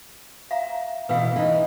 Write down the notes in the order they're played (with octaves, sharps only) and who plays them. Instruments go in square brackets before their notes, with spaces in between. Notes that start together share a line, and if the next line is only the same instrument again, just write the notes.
[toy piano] E5 F5 A#5
[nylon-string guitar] B2 E3 [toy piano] B4 F5
[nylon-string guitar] E3 D#4